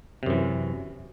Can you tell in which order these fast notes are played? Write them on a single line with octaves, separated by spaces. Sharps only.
C3 F#2 E3